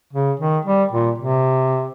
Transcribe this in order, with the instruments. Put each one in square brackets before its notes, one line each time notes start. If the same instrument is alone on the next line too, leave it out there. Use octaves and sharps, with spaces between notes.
[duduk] C#3
D#3
G3
A#2
C3